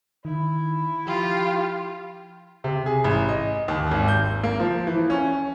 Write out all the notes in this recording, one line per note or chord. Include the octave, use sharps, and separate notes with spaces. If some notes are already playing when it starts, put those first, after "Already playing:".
D#3 E4
F3 F4 G4
C3
G#4
A1
D#5
D#2
G#1
G6
A#3
F3
E3
C#4